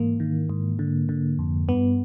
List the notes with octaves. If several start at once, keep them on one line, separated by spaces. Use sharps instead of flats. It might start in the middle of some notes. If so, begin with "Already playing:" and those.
Already playing: G#2 E3 A#3
D#3
G#2
D3
D3
F2
G2 B3